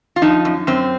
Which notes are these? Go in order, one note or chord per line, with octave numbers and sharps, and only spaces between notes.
F4
F3 D#4
F#2
F#2 C4